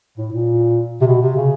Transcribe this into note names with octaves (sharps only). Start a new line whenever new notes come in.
A2
A#2
C3
B2
C3
C#3